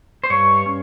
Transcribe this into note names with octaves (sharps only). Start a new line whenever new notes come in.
C5
G2 C#5
C#4